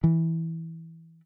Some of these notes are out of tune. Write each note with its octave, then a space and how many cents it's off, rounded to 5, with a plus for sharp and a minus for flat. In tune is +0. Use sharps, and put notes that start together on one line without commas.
E3 -10